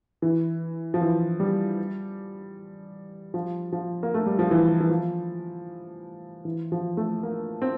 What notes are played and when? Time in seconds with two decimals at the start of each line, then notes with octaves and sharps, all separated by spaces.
0.22 E3
0.94 F3
1.01 E3
1.40 G3
3.34 F3
3.72 F3
4.03 A#3
4.14 A3
4.26 G3
4.39 F3
4.51 E3
4.80 E3
4.89 F3
6.45 E3
6.72 F3
6.97 A3
7.23 A#3
7.62 C4